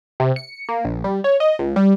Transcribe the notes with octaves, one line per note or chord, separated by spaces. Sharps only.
C3
C#7
A#3
A#1
G3
C#5
D#5
C#2
G3